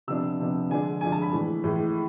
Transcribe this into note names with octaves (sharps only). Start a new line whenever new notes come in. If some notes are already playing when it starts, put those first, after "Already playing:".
C3 F3 B3 D4 E6
C3 F3 B3 D4
D3 F3 G#3 D4 G#5
D3 F3 G#3 D4 G#5
A5
B5
A2 E3 G#3
A2 E3 G#3